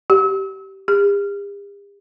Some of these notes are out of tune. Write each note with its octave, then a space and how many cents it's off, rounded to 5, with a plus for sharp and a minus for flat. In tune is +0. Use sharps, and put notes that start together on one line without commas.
G4 -20
G4 +45